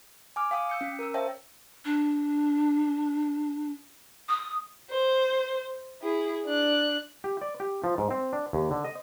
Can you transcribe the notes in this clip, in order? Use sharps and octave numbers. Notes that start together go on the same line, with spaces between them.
G#5 D6 F6
F5 G5 D#6
E6 G6 C#7
C#4
A#4 E6
C5 C#5 E5 F5 G5 A5
D4
D#6
C5
E4 G#4
D4 F#6
G4
D5
G4
F3
G#2
C4
D4
D#2
D3
D#5